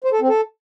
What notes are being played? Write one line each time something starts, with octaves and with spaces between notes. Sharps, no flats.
C5
A4
C4
A4